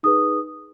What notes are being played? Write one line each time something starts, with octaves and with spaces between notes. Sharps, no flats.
D#4 G#4 B4 D#6